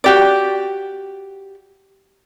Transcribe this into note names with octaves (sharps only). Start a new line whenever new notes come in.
F#4 G4 D5